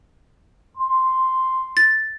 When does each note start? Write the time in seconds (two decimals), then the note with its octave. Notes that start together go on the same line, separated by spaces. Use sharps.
0.77 C6
1.77 A6